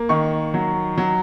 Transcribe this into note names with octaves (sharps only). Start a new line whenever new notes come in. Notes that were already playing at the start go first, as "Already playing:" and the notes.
Already playing: A#3
D#3 C#6
F#3
F#3